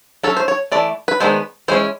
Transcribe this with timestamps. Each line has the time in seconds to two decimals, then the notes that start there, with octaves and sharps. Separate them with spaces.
0.23 F#3 A3 C#4 A4
0.37 C5
0.48 C#5
0.72 E3 A3 D5
1.08 B4
1.20 D#3 G#3 B3 D4 C5
1.68 E3 G#3 C#4 C5